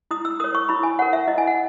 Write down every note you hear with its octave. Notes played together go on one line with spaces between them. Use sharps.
E4 D#6
E6
A#4 C#5 D#6
C#6
E4 B5
G#5
A#4 C#5 F#5
E5
E4 D#5
G#5
F#5